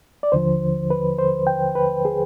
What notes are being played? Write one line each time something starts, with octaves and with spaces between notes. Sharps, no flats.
D5
D#2 D3 F3 C5
B4
C5
G5
B4
G#4